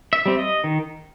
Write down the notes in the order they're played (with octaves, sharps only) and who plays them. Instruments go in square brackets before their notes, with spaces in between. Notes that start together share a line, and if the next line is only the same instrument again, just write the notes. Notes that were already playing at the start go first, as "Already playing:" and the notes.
[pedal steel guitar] E5
G3 C4
D#5
D#3